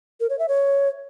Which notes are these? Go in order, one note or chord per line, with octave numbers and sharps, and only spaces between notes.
A#4
C#5
E5
C#5